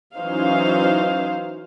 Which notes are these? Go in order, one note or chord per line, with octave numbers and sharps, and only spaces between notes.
E3 F#3 C#4 D#4 C5 F5